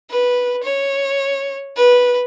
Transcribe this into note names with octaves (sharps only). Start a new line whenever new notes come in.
B4
C#5
B4